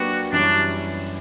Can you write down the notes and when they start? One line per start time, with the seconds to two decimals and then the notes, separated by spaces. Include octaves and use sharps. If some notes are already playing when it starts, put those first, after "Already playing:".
Already playing: F#3 A#3 D4 F#4 G4 B4
0.32 F#2 E3 G3 C#4 D4